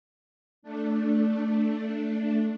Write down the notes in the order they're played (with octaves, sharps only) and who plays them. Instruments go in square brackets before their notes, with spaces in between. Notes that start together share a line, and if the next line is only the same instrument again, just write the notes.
[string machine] A3 D4